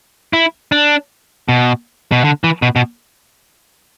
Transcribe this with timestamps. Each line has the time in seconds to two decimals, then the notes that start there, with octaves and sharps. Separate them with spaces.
0.33 E4
0.72 D4
1.49 B2
2.12 B2
2.24 D3
2.44 E3
2.62 B2
2.76 B2